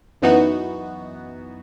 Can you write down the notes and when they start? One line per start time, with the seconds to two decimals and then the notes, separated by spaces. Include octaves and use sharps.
0.22 F#2 E3 B3 D#4 F#4